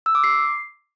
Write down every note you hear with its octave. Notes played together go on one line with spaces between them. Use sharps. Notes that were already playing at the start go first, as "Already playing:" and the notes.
E6
D6
C7